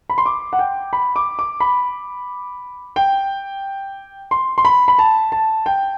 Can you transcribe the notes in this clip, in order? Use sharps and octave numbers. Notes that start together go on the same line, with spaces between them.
B5
C6
D6
F#5
G5
B5
D6
D6
B5
G5
C6
C6
B5
B5
A5
A5
G5